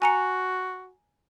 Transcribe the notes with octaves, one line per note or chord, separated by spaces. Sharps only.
F#4 G#5 A#5 C#7